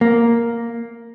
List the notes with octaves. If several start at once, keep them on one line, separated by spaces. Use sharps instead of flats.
A#3